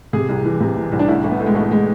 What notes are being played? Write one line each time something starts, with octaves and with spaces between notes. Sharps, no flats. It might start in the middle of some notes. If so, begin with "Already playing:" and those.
C3 G#4
C2
E3
C3
E3
C2
D4
A1 E4
A1
B3
A2
G#3
A1 A3
G#3